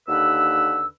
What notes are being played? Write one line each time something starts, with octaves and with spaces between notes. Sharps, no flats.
D#2 D3 B4 E6